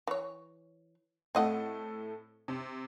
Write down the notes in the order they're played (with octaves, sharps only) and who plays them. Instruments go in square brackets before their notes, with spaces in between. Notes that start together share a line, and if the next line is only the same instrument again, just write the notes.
[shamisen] E3 C#5
[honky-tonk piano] A2 A3 [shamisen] C4 D#5 F#5
[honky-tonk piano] C3